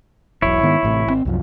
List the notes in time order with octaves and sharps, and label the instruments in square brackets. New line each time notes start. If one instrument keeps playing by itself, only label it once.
[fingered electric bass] E1 B1 [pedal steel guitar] E4 C#5
[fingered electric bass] G#2 D#3 B3
A1 A2 C3
G#1 B2 C4
C2 F#2 F3